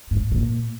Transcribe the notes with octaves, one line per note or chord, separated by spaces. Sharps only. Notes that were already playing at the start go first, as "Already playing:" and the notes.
G#2
A#2